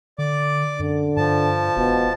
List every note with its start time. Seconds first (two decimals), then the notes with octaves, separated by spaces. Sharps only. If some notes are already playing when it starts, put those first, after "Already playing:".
0.18 D3 D5 D6
0.79 F#2 D3
1.17 G2 F3 A5
1.77 E1 B2